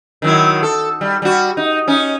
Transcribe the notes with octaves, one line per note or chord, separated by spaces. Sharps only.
D#3 F#3 E4
A4
G3
G3 F#4
D#4
C#4 D#4